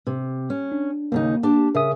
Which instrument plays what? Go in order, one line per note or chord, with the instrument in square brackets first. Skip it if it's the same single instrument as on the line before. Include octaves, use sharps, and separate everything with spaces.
[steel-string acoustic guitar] C3
C#4
[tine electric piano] D4
[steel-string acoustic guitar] D#2 C#3 D#4 [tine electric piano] A#3
[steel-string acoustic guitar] D4 G4 A5
[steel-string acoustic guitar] C#3 [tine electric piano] A#4 E5 D#6